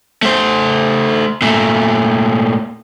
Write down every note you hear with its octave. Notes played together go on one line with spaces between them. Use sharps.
A3 C5
A#2 A3